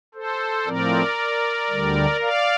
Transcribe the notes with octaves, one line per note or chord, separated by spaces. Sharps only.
A4 C5
A2 F3 C4 A#4 D5
D2 D3 G3
D5 F5